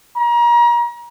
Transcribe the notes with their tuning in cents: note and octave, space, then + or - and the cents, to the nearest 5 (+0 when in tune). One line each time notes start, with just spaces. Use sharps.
A#5 +35